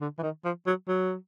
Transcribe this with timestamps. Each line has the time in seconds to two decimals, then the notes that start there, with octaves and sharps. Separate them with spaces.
0.01 D3
0.18 E3
0.22 D#3
0.45 F3
0.66 F#3
0.88 F#3